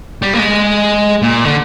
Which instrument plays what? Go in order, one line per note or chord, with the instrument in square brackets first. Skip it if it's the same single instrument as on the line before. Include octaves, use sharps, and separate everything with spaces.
[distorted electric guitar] G3
A#3
G#3
A#2
D3